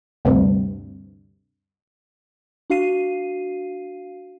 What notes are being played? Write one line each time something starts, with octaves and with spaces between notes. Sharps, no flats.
D2 G2 C3
D4 F#4 F5 C7 D#7